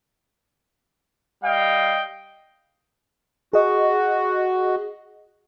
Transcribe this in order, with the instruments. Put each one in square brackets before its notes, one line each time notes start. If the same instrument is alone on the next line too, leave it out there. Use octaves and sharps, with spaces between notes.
[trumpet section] G3 D#5 F5 G5
[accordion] F#4 [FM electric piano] G#4 D#5